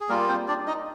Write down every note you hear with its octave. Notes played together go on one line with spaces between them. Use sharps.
G#4
G3 A#3 F4 A#4
C4 C5
D4 D5
D#4 D#5